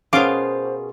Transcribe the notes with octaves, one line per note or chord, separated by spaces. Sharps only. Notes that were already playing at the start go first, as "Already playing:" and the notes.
B2 C#4 F4 G#4 A#4 C5 F5 D6